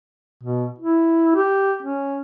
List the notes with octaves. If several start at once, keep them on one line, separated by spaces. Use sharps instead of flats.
B2
E4
G4
C#4